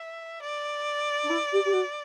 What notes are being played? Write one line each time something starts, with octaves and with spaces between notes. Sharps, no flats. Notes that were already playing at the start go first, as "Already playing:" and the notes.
Already playing: E5
D5
D4
E4
G4
G4
F#4